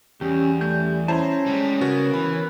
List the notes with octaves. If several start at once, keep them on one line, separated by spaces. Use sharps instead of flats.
E2 G3 C#4 G4
A3 G6
C#4 E4 C5 A5 A#5 C6
G3 G#3
C#3 B3 F#4 A#4 C#5
E3 B5